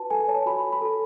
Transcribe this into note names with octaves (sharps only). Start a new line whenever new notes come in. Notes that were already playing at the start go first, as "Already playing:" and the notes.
Already playing: F#4 B4 A5
A4 G#5
C#5 A5
F#4 B5
F#4
B5
A4